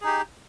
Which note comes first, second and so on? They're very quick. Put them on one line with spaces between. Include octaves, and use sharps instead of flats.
G#4 D#4 G4